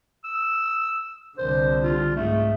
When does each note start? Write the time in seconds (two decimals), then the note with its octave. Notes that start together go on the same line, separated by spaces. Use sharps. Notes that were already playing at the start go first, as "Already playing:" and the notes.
0.24 E6
1.38 C2 D3 C5
1.83 F4
2.16 G#2 A3